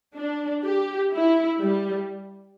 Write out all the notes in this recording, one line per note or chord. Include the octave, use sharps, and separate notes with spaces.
D4
G4
E4
G3